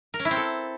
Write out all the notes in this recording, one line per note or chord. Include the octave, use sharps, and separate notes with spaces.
A#4
C#4
E4
C4
A4